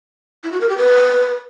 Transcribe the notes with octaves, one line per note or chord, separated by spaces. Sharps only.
E4
F#4
A#4
G4
B4